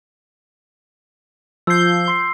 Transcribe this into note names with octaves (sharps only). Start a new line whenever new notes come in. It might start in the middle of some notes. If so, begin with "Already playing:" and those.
F3 E6 G6 C7
C6 C7